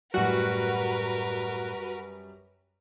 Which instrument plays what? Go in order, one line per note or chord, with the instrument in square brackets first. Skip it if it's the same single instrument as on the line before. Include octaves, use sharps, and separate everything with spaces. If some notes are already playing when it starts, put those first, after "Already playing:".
[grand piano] F#2 G3 [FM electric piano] A2 F#5 F#6 [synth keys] F#4 [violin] A#4 B4